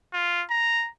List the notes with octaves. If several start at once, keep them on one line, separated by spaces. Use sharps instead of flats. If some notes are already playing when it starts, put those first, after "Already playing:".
F4
A#5